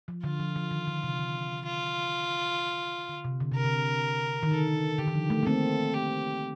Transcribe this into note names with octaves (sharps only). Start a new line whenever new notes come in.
F3
D3 F4
F3
F3
D#3
D3
C3
D3
F4
D3
C3
D3
C3 A#4
D3
D#3
D3 A4
D3 G4
D#3
F3
A3
A#3
A3 C4 A4
G4